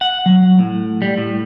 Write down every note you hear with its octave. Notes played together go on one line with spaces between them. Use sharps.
F#5
F#3
A2
G3
A2